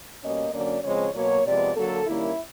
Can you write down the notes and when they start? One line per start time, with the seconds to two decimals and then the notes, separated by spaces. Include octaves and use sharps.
0.23 B2 G3 A#3 C#4 D#5
0.53 D3 F#3 A#3 C#4 D5
0.83 C#3 F3 G#3 C4 C#5
1.14 B2 F#3 A#3 C#5
1.46 C3 F3 G#3 B3 D5
1.76 D3 F#3 A#3 A4
2.07 D#3 G3 A#3 C#4 E4